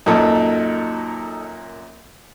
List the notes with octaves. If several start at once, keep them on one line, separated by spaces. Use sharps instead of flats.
F#2 A#2 D#4 A4